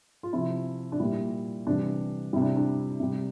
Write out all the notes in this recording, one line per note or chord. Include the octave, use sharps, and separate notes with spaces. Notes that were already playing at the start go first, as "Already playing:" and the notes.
F4
C3 F3 E4
D4
A#2 G3 E4
C3 E3 G3 D4
C3 G3 E4
D4
D4
C3 G3